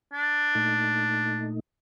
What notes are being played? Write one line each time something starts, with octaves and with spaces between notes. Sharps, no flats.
D4
A#2 A3 D#4